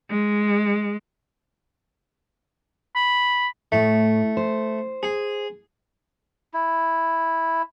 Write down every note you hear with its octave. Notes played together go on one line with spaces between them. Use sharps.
G#3
B5
A2 A3
C5
G#4
E4